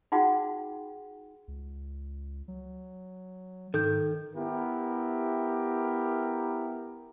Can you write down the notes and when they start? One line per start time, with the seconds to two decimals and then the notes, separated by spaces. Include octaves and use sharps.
0.12 D#4 F4 F#4 G#4 F#5 G5
1.48 C#2
2.48 F#3
3.74 G#2 D#3 A4 G6
4.35 B3 E4 G4 A#4